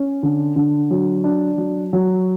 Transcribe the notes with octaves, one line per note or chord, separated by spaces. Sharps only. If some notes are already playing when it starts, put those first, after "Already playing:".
Already playing: C#4
D3
D3
F#3
D4
F#3
F#3